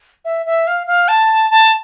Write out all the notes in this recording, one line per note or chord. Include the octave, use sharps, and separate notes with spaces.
E5
E5
F5
F5
A5
A5